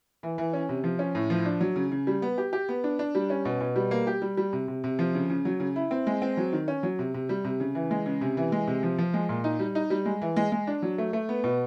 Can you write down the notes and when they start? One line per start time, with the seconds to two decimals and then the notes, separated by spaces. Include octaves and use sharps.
0.23 E3
0.38 E3
0.53 C#4
0.69 C3
0.84 F3
0.99 C#4
1.15 A2
1.30 F3
1.46 D4
1.61 F#3
1.76 C#3
1.92 C#3
2.07 G3
2.22 B3
2.38 G4
2.53 G4
2.69 B3
2.84 D4
2.99 D4
3.15 G3
3.30 C#4
3.45 B2
3.61 B2
3.76 G3
3.91 A#3
4.07 G4
4.22 G3
4.37 G3
4.53 C3
4.68 C3
4.84 C3
4.99 F3
5.14 C#3
5.30 C#3
5.45 F#3
5.60 C#3
5.76 E4
5.91 C4
6.07 G#3
6.22 C4
6.37 F#3
6.53 D#3
6.68 C#4
6.83 F#3
6.99 C3
7.14 C3
7.29 G3
7.44 C3
7.60 C#3
7.75 E3
7.91 G#3
8.06 C#3
8.21 C3
8.37 E3
8.52 G#3
8.67 C3
8.83 F3
8.99 F3
9.14 G#3
9.29 A#2
9.44 D#4
9.60 G3
9.75 D#4
9.90 G3
10.06 G#3
10.21 E3
10.36 G#3
10.52 G#3
10.67 D4
10.82 F#3
10.98 A3
11.13 A3
11.29 B3
11.44 B2